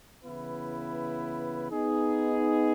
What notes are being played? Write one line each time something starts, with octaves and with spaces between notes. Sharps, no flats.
C#3 E3 B3 E4 B4
B3 D#4 G#4